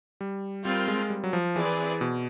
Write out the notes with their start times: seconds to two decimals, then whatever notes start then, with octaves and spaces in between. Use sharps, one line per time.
0.21 G3
0.65 G3 C4 F4 A#4
0.88 G#3
1.10 G3
1.24 F#3
1.33 F3
1.56 E3 C4 E4 G#4 B4 D5
2.01 B2